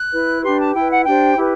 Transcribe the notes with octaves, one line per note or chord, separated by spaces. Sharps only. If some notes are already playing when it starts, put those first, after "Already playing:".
Already playing: F#6
E4 B4
D4 G4 B4 C6
A5
E4 B4 G5
F#5
D4 G4 C5 G5
E4 G4 B4